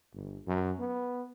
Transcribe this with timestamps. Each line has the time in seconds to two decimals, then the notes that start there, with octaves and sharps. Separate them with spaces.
0.14 G1
0.47 F#2
0.79 B3